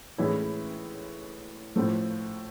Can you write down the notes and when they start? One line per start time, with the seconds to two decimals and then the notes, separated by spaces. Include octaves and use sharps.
0.18 A2 E3 G#3 C#4 E4
1.76 A2 F3 A3